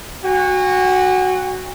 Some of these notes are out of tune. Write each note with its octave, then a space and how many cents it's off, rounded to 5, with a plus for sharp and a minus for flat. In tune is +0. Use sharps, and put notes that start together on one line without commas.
F#4 +0 G#5 -45